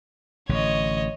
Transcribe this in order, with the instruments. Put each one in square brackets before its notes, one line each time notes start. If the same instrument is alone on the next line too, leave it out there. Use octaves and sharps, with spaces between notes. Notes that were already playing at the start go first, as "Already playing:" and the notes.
[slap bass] A1 D3 [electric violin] C#5 D#5